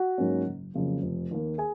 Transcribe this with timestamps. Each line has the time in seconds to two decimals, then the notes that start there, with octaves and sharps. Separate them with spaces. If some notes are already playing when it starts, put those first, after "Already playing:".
Already playing: F#4 F#5
0.18 G#2 F#3 A#3 C#4
0.47 F#1
0.74 F2 C#3 F#3 A#3
1.02 F1
1.31 D#2 D#3 A#3
1.58 G#4 G#5